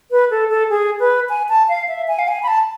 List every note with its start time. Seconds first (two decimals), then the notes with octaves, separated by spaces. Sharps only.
0.11 B4
0.31 A4
0.50 A4
0.70 G#4
1.00 B4
1.29 G#5
1.49 A5
1.69 F5
1.88 E5
2.08 G#5
2.19 F5
2.28 G#5
2.43 B5
2.48 A5